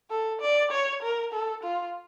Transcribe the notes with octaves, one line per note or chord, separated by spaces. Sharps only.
A4
D5
C#5
A#4
A4
F4